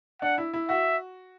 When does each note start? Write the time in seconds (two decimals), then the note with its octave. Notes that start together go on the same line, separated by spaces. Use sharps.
0.22 D4 F#5
0.38 E4
0.53 E4
0.69 F#4 E5